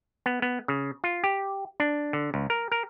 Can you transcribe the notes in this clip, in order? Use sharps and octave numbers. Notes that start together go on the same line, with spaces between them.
B3
B3
C#3
F4
G4
D4
D3
C#2
A#4
A#4